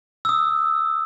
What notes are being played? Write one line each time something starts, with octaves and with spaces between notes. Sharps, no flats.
D#6 E6